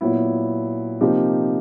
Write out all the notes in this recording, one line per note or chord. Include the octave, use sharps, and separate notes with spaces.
A#2 F#3 B3 E4
C3 F3 A#3 D#4 G4